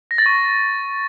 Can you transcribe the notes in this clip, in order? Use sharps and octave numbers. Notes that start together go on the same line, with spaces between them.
A#6
A6
C#6